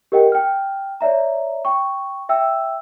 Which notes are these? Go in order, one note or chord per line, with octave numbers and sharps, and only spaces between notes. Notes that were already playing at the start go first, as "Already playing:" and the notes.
G4 A#4 D#5 F#5 G5
G5 F6
C#5 D5 E5 A#5
G5 C#6
E5 G5 E6